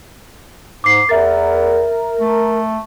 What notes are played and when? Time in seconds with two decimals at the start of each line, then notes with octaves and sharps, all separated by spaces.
0.84 G#2 D6 C7
1.09 E2 A#4 E5 A6
2.20 A3